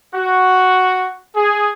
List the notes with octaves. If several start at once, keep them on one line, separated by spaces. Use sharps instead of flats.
F#4
G#4